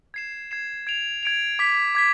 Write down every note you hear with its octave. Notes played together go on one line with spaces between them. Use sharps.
G#6 C7 E7
G#6 C7 E7
G#6 D7 F7
G#6 D7 F7
D6 G#6 B6
D6 G#6 B6